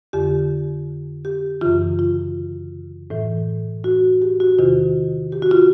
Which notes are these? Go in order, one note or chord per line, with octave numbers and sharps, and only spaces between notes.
F2 D3 G4
G4
F#2 C#3 E3 F4
F4
A2 E3
F#4
G4
F#4
E2 C3 D#3 F4
G4
F#4
F4